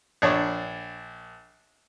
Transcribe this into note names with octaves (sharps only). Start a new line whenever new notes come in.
A#1 D4 C#5